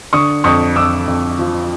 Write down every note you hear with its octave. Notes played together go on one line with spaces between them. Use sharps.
D3 C#6 D#6
F2 C#6 D#6
F2 D6 E6
F2
F3